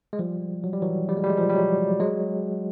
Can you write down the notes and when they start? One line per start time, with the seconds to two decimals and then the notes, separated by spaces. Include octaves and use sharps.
0.13 G#3
0.19 F3 G3
0.64 F#3
0.73 G3
0.82 E3 F#3
1.09 G3
1.17 G#3
1.23 G3
1.30 G#3
1.37 F3 G3
1.49 G3
1.54 F#3 G#3
2.00 F#3 G#3